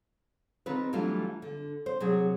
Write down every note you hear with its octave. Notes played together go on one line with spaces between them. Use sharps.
D#3 C4 F4 B4
E3 F#3 G3 A3 D4 F4
D3
C5
C3 F#3 G#4